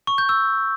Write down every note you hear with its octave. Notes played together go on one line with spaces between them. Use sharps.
C#6
G6
E6